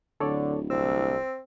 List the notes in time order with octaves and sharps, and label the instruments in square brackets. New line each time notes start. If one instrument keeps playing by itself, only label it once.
[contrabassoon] D1 [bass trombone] D3 [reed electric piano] A4 C#5 D5
[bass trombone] C2 [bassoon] C4 [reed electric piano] E6